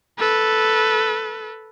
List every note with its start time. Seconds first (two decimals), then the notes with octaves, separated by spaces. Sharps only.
0.19 A4 B4